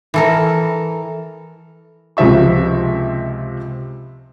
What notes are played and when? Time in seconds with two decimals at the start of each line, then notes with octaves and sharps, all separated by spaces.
0.14 E3 A4 A#4
2.17 C#2 C3 F3 E5 C#6